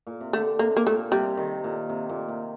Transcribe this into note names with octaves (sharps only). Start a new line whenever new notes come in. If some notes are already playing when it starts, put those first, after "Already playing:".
A#2
C3
D3 A3
C3 A#3
A#3
A#2 A3
C3 G3
D#3
A#2
C3
A#2
C3